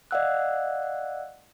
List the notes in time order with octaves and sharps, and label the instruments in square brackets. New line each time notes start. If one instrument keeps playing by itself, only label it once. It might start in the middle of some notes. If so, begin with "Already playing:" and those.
[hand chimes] D5 D#5 F5 F#5 E6 F#6